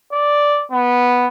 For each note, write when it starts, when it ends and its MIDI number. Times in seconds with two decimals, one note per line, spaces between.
0.13 0.65 74
0.71 1.27 59